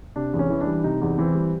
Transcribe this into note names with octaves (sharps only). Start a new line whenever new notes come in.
C3 D4
E2
C#4
E3
D4
G3
C3 D#4
E2
E3 C4
G3